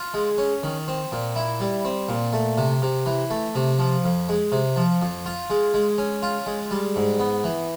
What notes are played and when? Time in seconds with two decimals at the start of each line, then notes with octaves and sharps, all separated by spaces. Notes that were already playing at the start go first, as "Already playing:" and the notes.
Already playing: F4
0.14 G#3
0.38 C#4
0.63 D#3
0.88 C4
1.12 A#2
1.36 E4
1.60 G3
1.85 C4
2.09 A#2
2.33 A3
2.58 C3
2.82 C3
3.06 E3
3.30 A3
3.55 C3
3.79 F3
4.04 F2
4.29 G#3
4.52 C3
4.76 F3
5.02 F2
5.26 F4
5.50 G#3
5.74 G#3
5.98 C#4
6.22 F4
6.47 G#3
6.71 G3
6.96 G#2
7.20 B3
7.44 E3